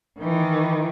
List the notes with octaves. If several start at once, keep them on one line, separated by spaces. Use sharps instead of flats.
D#3 E3